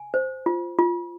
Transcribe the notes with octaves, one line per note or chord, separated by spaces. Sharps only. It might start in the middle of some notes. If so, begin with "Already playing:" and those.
Already playing: G#5
C5
F4
F4